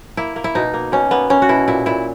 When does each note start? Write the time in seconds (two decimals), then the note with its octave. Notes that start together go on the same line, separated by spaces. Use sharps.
0.17 A#3 E4
0.36 A#3
0.44 E4
0.55 B2 D#4
0.74 A#3
0.92 B2 C#4
1.11 A#3 B3
1.30 A#3 C#4
1.42 F#4
1.49 B2 E4
1.68 A#2 E4
1.86 A#2 E4